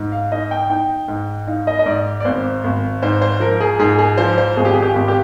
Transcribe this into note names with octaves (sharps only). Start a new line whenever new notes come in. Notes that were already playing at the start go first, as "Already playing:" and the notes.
Already playing: G#2
F5
D#4 D#5
G5
D#4 G5
G#2
D#4 F5
D#5
D#5
G#2 D5
D5
G#1 C5
G#1
G#2 C5
C5
F3 A#4
G#4
G#2 G#4
G#4
F3 C5
C5
G#1 G#4
G4
G#4
G4
G#1
G4